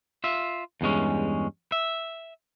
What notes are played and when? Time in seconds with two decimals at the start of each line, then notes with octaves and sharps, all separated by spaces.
0.24 F4 E5
0.81 E2 G2 G#3 C#4
1.72 E5